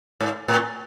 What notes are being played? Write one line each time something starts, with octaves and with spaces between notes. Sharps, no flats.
G#2
A2